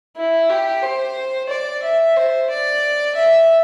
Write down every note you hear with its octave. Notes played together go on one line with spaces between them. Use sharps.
E4
G4
C5
D5
E5
C5
D5
E5